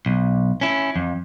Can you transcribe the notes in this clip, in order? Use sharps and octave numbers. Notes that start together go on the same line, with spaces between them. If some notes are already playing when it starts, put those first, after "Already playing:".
B1
C#4 E4
F2